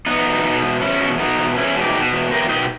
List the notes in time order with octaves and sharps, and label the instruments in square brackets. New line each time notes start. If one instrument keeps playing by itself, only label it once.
[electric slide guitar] E2 B3 D#4
B2
B2
E2
E2 C#4 E4
B2
B2 B3 D#4
E2
E2 C#4 E4
B2
D#4 G4
B2
E2
E2 G4 A#4
B2 D#4 G4